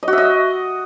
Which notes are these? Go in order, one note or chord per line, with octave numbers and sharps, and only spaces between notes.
D#5
F#4
E5
D#5